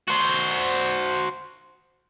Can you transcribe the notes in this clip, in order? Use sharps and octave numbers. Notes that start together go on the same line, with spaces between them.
F#4 C5